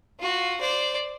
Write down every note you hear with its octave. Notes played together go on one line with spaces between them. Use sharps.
F4 F#4
C5 D5